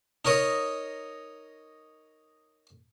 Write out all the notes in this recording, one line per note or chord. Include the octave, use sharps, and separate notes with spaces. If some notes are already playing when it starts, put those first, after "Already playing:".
D#4 A#4 C#5 D#5